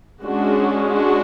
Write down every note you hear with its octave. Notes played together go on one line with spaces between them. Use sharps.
G#3 C#4 D4 F#4
D4 F#4